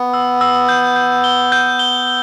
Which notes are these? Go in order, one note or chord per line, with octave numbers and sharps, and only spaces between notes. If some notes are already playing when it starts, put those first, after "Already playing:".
Already playing: B3
E6
E6
G6
G6
G7
G6
G7
G7